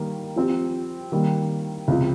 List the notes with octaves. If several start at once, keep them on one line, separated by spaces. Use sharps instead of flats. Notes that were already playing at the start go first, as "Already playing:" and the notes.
Already playing: D#3 G3 A#3
F3 C4 G4
D#3 G3 A#3
C#2 C3 F3